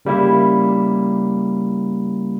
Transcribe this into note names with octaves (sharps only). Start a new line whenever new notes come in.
C#3 G3 A#3 E4